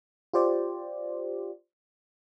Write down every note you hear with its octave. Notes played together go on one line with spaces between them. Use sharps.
F4 G4 C5 D5